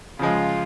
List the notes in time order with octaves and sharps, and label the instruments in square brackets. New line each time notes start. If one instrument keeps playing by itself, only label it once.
[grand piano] C#3 F3 G#3 [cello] F4